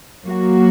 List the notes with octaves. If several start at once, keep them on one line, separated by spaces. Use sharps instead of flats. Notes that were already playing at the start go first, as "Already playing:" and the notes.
F#3 A#3 F#4